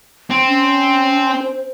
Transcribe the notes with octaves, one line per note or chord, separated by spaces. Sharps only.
C4
C#4
C5